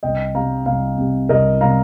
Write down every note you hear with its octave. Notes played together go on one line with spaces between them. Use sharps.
C2 D#5 G5
C3 G3 F5 A#5
C2 F5 A#5
C3 G3
C2 A#4 D#5
C3 G3 F5 A#5